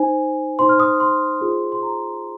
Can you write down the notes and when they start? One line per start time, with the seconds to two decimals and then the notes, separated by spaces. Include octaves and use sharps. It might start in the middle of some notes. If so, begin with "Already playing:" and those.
Already playing: D#4 C5 G#5
0.59 D#4 C5 C6
0.69 F6
0.80 D#6
1.00 C6
1.41 F4 G#4 C5
1.72 C6
1.83 A#5